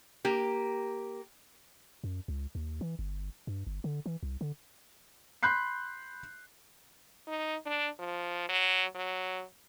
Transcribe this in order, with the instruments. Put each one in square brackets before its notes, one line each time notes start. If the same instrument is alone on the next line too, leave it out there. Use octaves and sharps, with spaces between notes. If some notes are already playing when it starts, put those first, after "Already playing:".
[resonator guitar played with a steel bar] A#3 G4
[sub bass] F#2
C#2
D#2
E3
G1
G2
G1
D3
E3
C2
D3
[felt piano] B5 C6 F#6 G6 C7
[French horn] D#4
D4
F3
F#3
F#3